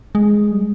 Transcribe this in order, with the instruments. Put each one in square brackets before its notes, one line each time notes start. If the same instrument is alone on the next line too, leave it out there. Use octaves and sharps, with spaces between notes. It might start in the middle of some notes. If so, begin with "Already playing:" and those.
[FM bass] G#3
G3